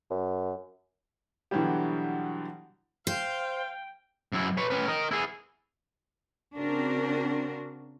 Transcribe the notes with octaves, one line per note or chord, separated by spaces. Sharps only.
F#2
B2 D3 E3 F#3 G3 G4
C5 F5 G5
F#2 E4
B4 C#5
C#4 B4
A#4 D#5
E4 G#4
C#3 C4 D4 F#4 A#4